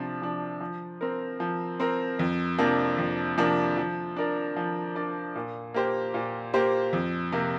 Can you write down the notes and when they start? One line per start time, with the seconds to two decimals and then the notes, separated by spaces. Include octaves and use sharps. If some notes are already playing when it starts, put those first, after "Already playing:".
Already playing: C3 F3 D4
0.22 F3 D4
0.61 F3
1.01 C4 A#4
1.40 F3
1.80 C4 A#4
2.19 F2
2.58 C3 F3 A#3 D4
2.98 F2
3.38 C3 F3 A#3 D4
3.77 F3
4.16 D4 A#4 D5
4.56 F3
4.95 D4 A#4 D5
5.35 A#2
5.74 A#3 G4 C5
6.14 A#2
6.54 A#3 G4 C5
6.93 F2
7.32 C3 A#3